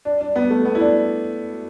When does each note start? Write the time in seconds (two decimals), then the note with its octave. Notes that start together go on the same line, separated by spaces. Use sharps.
0.05 D4
0.21 D4
0.36 B3
0.50 A3
0.65 B3
0.75 E4
0.80 D4